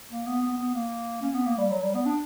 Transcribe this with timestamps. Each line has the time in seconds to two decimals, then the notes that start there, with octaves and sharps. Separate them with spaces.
0.10 A#3
0.26 B3
0.42 B3
0.58 B3
0.74 A#3
1.22 C#4
1.34 B3
1.46 A#3
1.58 G3
1.71 F#3
1.83 G3
1.94 B3
2.06 D4